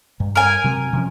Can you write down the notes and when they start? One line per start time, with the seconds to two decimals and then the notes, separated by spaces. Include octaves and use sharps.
0.20 G2
0.35 A#4 G#5
0.64 C3 F#3
0.93 C3 F3 C#4